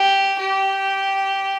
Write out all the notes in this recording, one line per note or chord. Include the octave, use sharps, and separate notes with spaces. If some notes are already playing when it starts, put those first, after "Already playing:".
Already playing: G4
G4